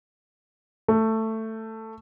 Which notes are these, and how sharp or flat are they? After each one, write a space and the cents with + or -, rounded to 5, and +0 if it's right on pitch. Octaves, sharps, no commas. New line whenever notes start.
A3 +10